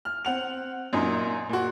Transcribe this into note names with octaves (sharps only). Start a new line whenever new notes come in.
F6
C4 F#5 F7
F#2 A#2 D#4
A#2 F#4